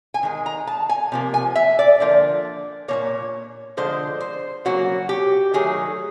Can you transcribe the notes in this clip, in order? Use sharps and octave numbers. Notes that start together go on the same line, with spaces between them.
G#5
D#3 G#3
A#5
A5
G#5
C3 F3 A#3
G#5
E5
D5
D3 F3 A#3
A#2 F3 A#3 C#5
D3 F3 G#3 C5
C5
C#3 F#3 A#3 F#4
G4
D#3 F#3 A3 G#4